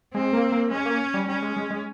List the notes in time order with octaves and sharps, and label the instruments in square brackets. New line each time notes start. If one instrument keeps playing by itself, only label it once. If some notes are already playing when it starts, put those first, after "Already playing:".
[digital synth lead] G#3 [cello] C4
[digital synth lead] A#3
A#3
[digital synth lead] G#3 [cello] C#4
[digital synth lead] A#3
G3
[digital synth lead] G3 [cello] C#4
[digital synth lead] G#3
G#3
G#3